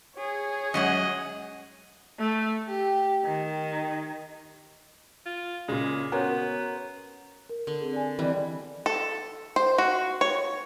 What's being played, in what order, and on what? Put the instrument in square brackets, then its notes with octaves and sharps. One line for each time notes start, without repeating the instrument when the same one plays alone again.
[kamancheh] G#4 C#5
[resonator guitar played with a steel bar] F#2 G#3 F#5 [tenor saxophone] D#5
[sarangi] A3
G4
D#3
[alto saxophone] F4
[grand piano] A#2 C#3 [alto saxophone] G#3
[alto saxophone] B3 [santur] C#4 A#4 C5 [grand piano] F#4
[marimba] A#4
[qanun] D3
[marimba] C4 G#4
D5 G#5
[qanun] E3 G3 [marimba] C4 D5 D#5
[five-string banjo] A4
C5
F#4
C#5